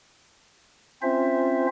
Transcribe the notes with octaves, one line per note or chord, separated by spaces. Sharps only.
C4 C#4 F4 C5 E5